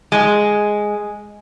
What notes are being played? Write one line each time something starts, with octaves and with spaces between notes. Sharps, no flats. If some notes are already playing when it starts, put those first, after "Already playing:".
G#3